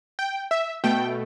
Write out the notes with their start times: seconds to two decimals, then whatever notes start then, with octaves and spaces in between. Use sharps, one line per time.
0.19 G5
0.51 E5
0.84 B2 A3 G5